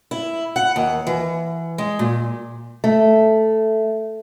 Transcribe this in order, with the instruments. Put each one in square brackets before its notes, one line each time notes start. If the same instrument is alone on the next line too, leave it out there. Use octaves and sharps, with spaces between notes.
[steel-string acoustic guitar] E4
F#5
D#2
E3
G#3
A#2
A3